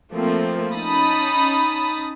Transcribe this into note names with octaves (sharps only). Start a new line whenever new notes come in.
F3 A3 A#3 C4
C#4 D#4 A5 B5 D#6